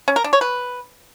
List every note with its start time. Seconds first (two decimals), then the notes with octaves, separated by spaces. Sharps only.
0.08 C#4
0.16 A#4
0.24 D4
0.33 C#5
0.41 B4